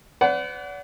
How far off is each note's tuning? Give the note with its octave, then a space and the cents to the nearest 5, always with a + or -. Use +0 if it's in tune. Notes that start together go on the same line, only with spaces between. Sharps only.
B4 +40 D5 -40 F#5 +0